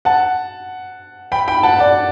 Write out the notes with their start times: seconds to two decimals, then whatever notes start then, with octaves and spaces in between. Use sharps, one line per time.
0.05 F#5 A5
1.32 G5 B5
1.48 G5 B5
1.63 F#5 A5
1.79 D5 F#5